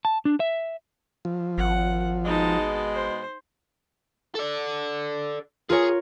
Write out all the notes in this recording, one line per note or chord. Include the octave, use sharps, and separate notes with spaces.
A5
D4
E5
F3
G#1 F#5
B2 G#3 D#4 A5
C5
A4 D5
F4 G#4 A#4 C#5 G#5